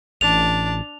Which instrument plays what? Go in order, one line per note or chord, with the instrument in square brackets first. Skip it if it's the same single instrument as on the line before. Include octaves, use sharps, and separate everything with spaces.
[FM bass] A1 [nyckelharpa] D4 A5 [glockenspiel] F7